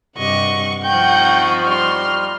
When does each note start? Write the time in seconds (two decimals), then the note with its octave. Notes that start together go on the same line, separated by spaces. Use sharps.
0.17 G2 C3 D#5 F#5 C#6
0.85 F3 C4 D#4 F#5 G5 C#6 G6
1.66 G3 C6 F6